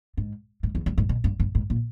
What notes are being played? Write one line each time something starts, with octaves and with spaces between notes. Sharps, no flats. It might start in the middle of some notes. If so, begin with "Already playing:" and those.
G#2
G#2
E2
G2
G#2
B2
G2
G2
G#2
A#2